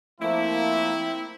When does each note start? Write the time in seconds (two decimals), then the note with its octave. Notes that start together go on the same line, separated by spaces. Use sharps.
0.21 F3 A3 A#3 C4 E4